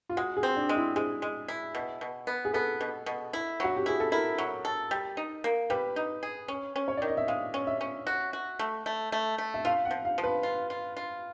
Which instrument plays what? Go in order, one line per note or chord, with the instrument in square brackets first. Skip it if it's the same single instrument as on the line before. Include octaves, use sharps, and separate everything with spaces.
[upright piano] F4
[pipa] G#3 [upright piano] F#4
[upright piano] G#4
[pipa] C4
[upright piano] D4
[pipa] G#3
[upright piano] E4
[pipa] G#3 [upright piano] G#4
[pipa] G#3
E4
B2
B2
B3
[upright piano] G#4
[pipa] B3 [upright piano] A4
[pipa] B2
B2
E4
[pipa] F#3 [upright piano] F#4
[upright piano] G4
[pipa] E4 [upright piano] G#4
[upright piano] A4
[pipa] E4 [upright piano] A#4
[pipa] F#3
A4
G3
D#4
A#3
[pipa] G3 [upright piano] B4
[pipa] D#4
G#4
C#4
C#4
[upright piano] C#5
[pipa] D#3 [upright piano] D5
[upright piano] D#5
E5
[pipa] G#3 [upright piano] F5
[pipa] C#4
[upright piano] E5
[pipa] C#4
F#4
F#4
A3
A3
A3
A3
[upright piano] E5
[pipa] F4 [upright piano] F5
[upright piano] F#5
[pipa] F3
[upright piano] F5
[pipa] F3
[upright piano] B4
[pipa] F4
F4
F4